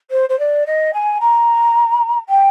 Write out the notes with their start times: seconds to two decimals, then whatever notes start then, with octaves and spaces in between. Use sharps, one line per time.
0.10 C5
0.29 C5
0.39 D5
0.66 D#5
0.93 G#5
1.20 A#5
2.29 G5